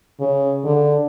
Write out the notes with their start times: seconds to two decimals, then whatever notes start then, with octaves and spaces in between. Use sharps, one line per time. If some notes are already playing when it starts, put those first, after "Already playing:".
0.20 C#3
0.64 D3